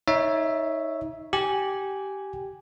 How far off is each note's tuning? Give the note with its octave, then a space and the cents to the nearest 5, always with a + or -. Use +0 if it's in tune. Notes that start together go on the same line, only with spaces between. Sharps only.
D#4 +25 C#5 +0 E5 +0
G4 -15 G#5 -5